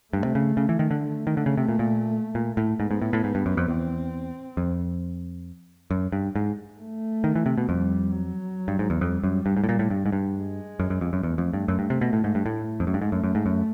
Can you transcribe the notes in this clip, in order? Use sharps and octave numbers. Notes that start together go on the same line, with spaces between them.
G2 A3
C3
C#3
C#3
E3
D#3
D3
A3
D#3
D3
C#3
C3
A#2
A#2
A#2
A2
G#2 B3
G#2
A2
A2
G#2
G2
F#2
F2
E2 C4
F2
F#2
G2
G#2
A3
D#3
E3
C3
B2
F2 G3
F#3
G2
G#2
E2
F2 G3
F#2
G2
G#2
A2
A#2
A2
G2
G#2
G2
G#3
F#2
F#2
F2
F#2
E2 A3
F2
G2
F#2
G2
C3
B2
A2
G#2
G2
A2
F2
F#2
G2
G#2 A3
F#2
F#2
G#2
F#2